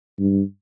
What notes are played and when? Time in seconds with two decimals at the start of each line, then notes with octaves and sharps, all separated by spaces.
0.19 G2